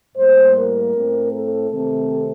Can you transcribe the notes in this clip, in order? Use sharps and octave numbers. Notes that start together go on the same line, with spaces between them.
A2 G3 A#3 C5
A#4
A2 A3 C4
A4
C3 D#3 A3 C4 A4